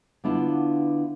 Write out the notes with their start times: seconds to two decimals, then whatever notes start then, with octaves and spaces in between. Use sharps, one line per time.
0.24 D3 B3 D4 E4 F4